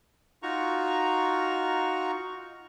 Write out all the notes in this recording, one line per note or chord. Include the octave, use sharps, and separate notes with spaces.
D#4 F4 F#4 A#5 C#6